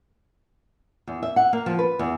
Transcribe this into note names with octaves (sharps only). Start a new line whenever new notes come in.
E2
E5
F#5
A#3
F3
B4
E2